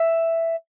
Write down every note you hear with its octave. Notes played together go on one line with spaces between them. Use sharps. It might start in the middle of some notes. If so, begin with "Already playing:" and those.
Already playing: E5